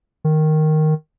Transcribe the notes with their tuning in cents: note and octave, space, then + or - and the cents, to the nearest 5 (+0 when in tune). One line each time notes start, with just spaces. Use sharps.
D#3 -5